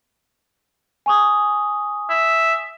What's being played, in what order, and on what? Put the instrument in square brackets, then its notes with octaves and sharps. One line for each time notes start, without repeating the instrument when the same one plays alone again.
[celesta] G#5 C#6 D#6
[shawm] E5